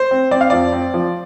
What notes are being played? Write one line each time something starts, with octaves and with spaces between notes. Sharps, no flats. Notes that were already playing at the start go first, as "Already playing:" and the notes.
Already playing: C5
C4
C4 D5
F5
F2 D5
C4
F3